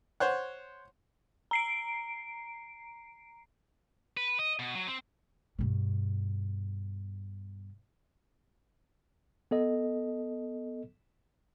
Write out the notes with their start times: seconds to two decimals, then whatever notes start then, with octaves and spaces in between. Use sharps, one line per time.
0.20 C5 C#5 F#5
1.51 A#5 C7 D7
4.17 B4
4.39 D#5
4.59 B2
4.75 F#3
4.87 C4
5.59 G2 B2
9.51 B3 A4 D#5